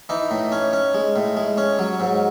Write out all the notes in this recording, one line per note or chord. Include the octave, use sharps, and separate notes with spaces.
E3 D#4
A2
C#4
C#4
G#3
A2
G#3
C#4
F#3
G#2